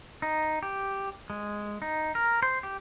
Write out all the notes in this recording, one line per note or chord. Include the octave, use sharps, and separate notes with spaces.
D#4
G4
G#3
D#4
A#4
C5
G4